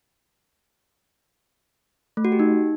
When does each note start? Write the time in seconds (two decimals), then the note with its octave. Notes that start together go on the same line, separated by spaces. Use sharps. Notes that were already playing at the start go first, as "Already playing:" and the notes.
2.17 A3
2.25 F#4
2.32 G4
2.39 D#4